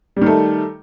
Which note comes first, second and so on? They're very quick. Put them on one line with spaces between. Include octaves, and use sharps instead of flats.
G3 D#3 A3